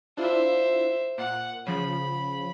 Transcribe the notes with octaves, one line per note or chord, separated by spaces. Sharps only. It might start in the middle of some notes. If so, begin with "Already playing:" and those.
D4 E4 F4 C5 E5
A#2 F#5
C#3 F3 B5